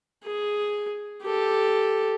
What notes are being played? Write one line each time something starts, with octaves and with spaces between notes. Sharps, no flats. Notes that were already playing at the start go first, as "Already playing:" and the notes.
G#4
G4 A4